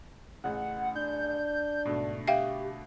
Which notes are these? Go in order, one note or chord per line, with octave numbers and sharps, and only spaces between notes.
A1 C#3 F#5
D4 G6
G#2 B2 D3 A3
G4 E5 F5 G5